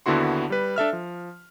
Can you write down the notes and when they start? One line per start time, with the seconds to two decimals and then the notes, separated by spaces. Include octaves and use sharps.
0.06 D#2 D3 B3 E4 F#4 C6
0.50 G3 B4
0.76 D4 A4 E5 F6
0.93 F3